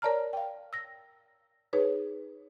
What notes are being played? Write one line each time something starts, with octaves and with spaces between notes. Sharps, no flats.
A#4 C#5 D5 A5 A#5 F6
F5 G5
E6 A#6
D#4 G#4 B4 C#5